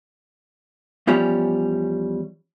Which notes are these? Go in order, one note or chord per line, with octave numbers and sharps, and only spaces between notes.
E2 F3 G3 C#4